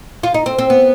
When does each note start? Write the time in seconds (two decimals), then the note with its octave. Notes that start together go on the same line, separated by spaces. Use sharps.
0.23 F4
0.34 D#4
0.46 C4
0.59 C4
0.70 B3